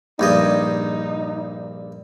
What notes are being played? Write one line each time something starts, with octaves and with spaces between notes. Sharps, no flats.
A#1 G2 D#4 D#5